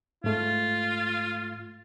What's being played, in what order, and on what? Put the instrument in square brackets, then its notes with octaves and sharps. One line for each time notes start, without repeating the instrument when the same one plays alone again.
[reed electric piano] G#2 A3 [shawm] F4